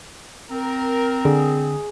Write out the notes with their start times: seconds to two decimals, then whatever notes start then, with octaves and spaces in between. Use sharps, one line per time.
0.51 C4 A#4
1.25 D3 G#4